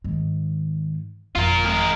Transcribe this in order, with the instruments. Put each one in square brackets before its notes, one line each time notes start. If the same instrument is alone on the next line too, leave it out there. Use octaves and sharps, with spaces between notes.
[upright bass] G#2 D#3
[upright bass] G1 F2 [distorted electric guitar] F4 A#4
[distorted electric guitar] G#3 A#4